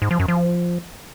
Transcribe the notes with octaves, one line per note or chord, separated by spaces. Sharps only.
G#2
F3
F#2
F3